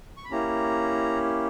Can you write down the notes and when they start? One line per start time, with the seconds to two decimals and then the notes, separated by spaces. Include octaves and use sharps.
0.17 C#6
0.24 B5
0.31 A#3 C#4 E4 G4 A#5